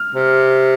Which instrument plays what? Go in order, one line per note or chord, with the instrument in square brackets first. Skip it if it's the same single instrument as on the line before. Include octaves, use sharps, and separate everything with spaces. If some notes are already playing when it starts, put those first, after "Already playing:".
Already playing: [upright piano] F6
[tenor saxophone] C3